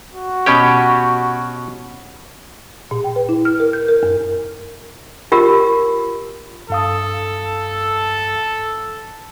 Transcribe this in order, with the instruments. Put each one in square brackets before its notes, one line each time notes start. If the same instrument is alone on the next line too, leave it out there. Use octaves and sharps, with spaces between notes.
[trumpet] F#4
[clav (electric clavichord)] B2 C#4 G4
[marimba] A#2
G5
B4
E4
F6
A#4
G6
A#4
F#2
[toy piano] F4 G4 A#4
[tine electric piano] G2 F5 D#6 [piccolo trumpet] A4